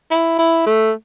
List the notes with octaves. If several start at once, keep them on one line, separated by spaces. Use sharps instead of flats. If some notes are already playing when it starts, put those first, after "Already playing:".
E4
E4
A3